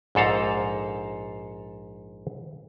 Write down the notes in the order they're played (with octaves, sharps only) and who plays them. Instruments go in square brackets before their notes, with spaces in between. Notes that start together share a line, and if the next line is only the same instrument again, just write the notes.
[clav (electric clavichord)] A#1 G#2 A4 F5 A#5